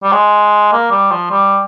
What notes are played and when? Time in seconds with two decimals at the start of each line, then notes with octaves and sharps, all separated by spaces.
0.03 G3
0.12 G#3
0.72 A#3
0.91 G3
1.11 F3
1.31 G3